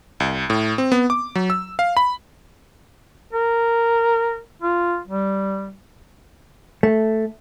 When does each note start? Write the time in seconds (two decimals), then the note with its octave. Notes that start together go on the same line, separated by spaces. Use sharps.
0.20 C2
0.50 A2
0.78 C4
0.92 B3
1.10 D6
1.35 F#3
1.50 E6
1.79 F5
1.97 B5
3.33 A#4
4.62 F4
5.07 G3
6.83 A3